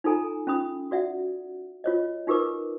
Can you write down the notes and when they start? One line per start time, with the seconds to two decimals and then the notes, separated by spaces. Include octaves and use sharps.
0.04 D#4 F4 A4 G#5 A#5
0.47 C#4 F4 B5 D#6
0.91 F#4 D5 E5 F#5
1.84 F4 C#5 D#5
2.27 D#4 F4 G4 A#4 B4 D6